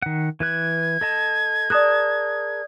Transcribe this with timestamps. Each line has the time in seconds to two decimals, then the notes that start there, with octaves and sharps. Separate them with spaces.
0.02 D#3 F#5
0.40 E3 B4 F#6 G#6
1.01 A4 D#5 A5
1.70 G#4 A#4 D5 A5 D#6 F#6